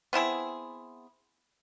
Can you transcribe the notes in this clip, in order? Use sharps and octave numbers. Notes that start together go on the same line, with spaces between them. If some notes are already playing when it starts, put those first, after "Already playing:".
B3 C4 E4 G#4